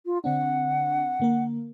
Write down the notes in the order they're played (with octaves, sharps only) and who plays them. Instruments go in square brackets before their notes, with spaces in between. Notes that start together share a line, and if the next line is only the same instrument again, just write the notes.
[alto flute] F4
[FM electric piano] D3 C4 D4 [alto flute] F#5
[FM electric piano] D3 A#3 A#4